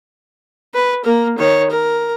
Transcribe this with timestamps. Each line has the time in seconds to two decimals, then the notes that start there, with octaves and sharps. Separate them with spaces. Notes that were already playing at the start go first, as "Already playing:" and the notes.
0.74 B4
1.04 A#3 A#4
1.38 D#3 C#5
1.71 A#4